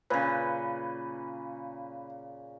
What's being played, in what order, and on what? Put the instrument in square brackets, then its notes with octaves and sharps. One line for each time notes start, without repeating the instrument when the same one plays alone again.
[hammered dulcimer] A#2 C#3 [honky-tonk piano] B4